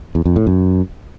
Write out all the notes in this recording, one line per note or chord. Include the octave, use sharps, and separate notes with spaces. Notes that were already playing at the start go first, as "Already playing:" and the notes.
E2
F2
A2
F#2